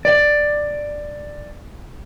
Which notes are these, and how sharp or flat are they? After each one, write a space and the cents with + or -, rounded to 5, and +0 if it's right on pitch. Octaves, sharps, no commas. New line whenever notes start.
D5 +10